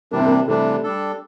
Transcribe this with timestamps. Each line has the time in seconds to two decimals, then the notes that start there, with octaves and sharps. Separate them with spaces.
0.11 C3 E3 G3 A#3 D4
0.19 C4
0.26 A#3
0.48 C3 E3 G3 A3 D4
0.84 G3 D4 A4